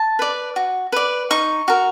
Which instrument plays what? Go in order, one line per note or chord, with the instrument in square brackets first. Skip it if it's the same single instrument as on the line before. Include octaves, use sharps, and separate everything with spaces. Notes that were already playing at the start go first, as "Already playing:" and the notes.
Already playing: [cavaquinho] A5
B4 D5
F#4
B4 D5
D#4 C#6
F#4 A#4